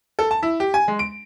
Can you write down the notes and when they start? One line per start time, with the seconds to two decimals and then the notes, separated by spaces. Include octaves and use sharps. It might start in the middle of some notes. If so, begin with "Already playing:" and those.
0.19 A4
0.31 A5
0.43 E4
0.60 G4
0.74 G#5
0.88 G#3
0.99 D7